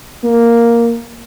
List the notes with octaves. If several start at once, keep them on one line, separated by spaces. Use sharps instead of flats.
A#3